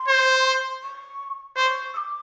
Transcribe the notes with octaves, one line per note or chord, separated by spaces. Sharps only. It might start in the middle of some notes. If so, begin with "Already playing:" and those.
Already playing: C6
C5
C#6
C5 C#6
E6
D6